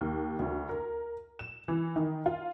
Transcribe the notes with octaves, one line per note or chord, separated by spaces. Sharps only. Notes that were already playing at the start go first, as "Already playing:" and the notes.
D#2
D2
A#4
E7
E3
D#3
F4